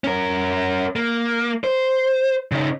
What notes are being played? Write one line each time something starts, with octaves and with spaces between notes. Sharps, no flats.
C#4 A#4
A#3
C5
C#3 D#4